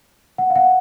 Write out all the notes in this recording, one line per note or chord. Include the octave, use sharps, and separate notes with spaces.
F#5
F5
F#5